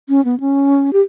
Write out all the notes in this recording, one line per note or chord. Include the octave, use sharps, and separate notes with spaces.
C#4
B3
C#4
G4